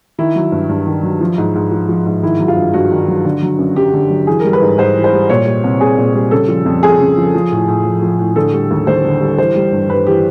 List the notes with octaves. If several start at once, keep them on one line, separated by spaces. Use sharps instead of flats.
D#3 E4
F#3
G2
G2
D#3
F#3
F3
G#2
G#2
F3
F3
G#2
D#3 E4
F#3
F4
G2
G2 F#4
D#3
F#3
D3
F#3
F#2
F#2 G4
D3
F#3
E3 G#4
G3 A#4
B4
G#2
G#2 C5
E3
C5
G3
A#2 C#5
G3
C2
C2 G#4
A#2
G3
C#3 A4
F3
F2
F2 G#4
C#3
F3
F3
A2
A2
F3
F3
A2
D3 A4
G3
D#2
D#2 C5
D3
G3
E3 C5
G3
G2
G2 B4
E3 G4